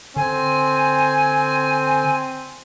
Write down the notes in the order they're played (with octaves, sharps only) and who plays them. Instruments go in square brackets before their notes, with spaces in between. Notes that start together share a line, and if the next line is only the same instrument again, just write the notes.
[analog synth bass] D3 [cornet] C4 [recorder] G#5